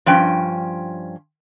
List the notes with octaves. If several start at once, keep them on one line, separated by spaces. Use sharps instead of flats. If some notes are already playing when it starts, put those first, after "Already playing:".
G2 F3 C#4 G5